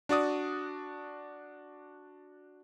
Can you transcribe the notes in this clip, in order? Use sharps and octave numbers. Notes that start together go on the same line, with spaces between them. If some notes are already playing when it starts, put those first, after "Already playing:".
D4 F#4 D5 D#6